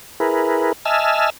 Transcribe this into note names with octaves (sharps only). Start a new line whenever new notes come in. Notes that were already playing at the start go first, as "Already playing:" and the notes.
E4 G#4 A#4 B4
D#5 E5 G#5 A5 E6 F6